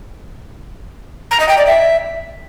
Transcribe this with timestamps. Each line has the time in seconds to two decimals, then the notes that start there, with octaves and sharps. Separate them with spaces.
1.31 A#5
1.40 D#5
1.49 G5
1.58 D5
1.67 E5